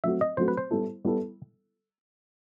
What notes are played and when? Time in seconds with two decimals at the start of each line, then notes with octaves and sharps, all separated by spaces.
0.04 F#3 A3 C4 F#4 E5
0.21 D#5
0.37 F#3 A3 C4 F#4 C5
0.48 B4
0.57 C5
0.71 G3 B3 E4 A4
1.05 G3 B3 E4 A4